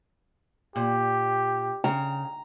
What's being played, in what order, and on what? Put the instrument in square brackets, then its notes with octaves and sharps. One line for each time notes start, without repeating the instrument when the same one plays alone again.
[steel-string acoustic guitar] A#2 [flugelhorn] G4
[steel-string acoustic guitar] C#3 [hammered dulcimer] A#5